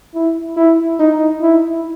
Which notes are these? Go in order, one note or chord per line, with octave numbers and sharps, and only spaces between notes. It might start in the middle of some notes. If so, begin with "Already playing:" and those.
E4
E4
D#4
E4